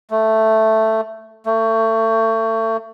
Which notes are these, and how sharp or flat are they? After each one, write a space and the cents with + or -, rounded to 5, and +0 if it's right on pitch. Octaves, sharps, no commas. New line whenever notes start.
A3 +5
A3 +30